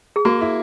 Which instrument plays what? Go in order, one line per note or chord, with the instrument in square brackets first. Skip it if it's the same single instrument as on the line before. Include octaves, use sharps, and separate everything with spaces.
[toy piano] G#4
[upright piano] A#3 [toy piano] F#4
[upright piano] E4